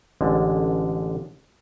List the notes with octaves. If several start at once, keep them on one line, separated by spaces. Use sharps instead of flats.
A1 D3 G#3 A5